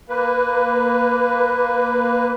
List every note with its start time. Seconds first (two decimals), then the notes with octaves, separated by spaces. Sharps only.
0.09 A#3 B4